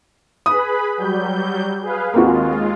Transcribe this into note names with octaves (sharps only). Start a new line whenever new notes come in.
G#4 B4 B5 D#6
F#3 G3 G6
G#4 B4 F5
D#2 G#3 A#3 C4 F4 F#4